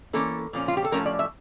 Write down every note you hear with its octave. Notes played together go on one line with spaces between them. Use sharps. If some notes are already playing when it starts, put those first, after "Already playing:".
E3 A#3 C#4 A4
A#2 F3 C#4
F4
G4
A4
A2 F3 A3 C#4 A#4
D5
E5